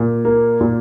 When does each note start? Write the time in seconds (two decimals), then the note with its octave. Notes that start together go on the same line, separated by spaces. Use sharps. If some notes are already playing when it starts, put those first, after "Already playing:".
Already playing: A#2
0.25 A#3
0.61 A#2